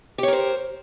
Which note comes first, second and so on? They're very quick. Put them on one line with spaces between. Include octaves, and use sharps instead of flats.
G4 C#5 A#4 C5